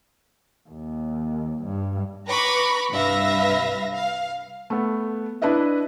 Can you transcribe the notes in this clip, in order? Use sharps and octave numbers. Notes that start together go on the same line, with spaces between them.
D#2
G2
B4 A#5 B5 C#6 D6
C2 G2 B4 E5 F5 A#6
F5
A3 B3
D4 E4 B4 D#5 E5